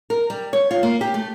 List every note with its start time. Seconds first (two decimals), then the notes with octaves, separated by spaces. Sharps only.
0.10 A#4
0.30 G3
0.53 C#5
0.71 F4
0.83 A#3
1.01 G4
1.14 A3